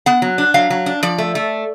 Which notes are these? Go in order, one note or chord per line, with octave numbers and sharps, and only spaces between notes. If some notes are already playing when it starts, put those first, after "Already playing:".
B3 F#5
F#3
D4
F#3 F5
F#3
D4
F3 D5
A3
A3